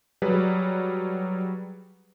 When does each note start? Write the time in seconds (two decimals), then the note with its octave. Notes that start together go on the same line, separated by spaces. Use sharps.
0.22 F#3 G3 G#4 B4